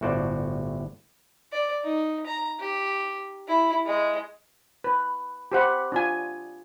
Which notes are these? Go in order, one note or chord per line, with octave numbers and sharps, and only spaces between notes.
G1 A2 F#4 C5 D5
D5
D#4
A#5
G4
E4
G#3
B4
G4 C5 F#5 B5
D4 F4 G#5